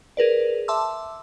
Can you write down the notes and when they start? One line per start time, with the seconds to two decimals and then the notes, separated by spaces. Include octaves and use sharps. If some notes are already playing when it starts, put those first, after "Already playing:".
0.17 G#4 A#4 B4 D5
0.68 E5 A5 C6 D6 E6